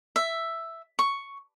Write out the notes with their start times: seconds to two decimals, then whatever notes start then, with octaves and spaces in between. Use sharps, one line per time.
0.16 E5
0.99 C#6